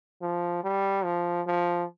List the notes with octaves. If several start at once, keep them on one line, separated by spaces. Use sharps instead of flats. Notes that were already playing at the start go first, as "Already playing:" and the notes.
F3
G3
F3
F3